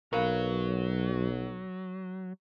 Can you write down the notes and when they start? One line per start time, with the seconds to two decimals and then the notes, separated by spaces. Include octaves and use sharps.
0.13 B1 F#3 A#4 B4 F5